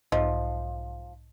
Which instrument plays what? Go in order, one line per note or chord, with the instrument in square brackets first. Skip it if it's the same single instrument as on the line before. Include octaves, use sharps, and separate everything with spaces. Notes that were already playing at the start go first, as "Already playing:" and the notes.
[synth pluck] B1 G#2 [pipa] F3 [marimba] D#5